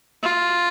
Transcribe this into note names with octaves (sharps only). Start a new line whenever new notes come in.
F4